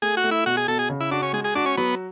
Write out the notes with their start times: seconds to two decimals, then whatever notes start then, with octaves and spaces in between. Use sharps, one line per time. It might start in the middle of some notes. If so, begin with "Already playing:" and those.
0.02 A3 G#4
0.17 F#4
0.24 A3
0.31 E4
0.46 B2 F#4
0.57 G#4
0.68 B2 A4
0.79 G#4
0.90 C#3
1.00 E4
1.11 D4 F#4
1.22 C#4
1.33 G#3 G#4
1.44 G#4
1.55 D4 F#4
1.66 C#4
1.77 F#3 B3